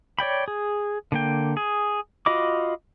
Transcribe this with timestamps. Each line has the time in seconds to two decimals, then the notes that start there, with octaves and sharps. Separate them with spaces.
0.19 C#5 D5 G5 B5
0.48 G#4
1.12 D3 A#3 G5
1.57 G#4
2.26 F4 F#4 D#5 B5 D6